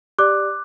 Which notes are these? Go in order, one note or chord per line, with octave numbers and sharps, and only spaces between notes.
G4 D5 D6 F#6